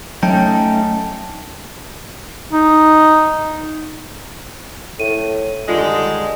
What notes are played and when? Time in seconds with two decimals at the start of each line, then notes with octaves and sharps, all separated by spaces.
0.23 F#3 A3 C#4 D#4 G5 A5
2.51 D#4
5.00 A2 D#7
5.68 G2 D3 D#3 G#3 F4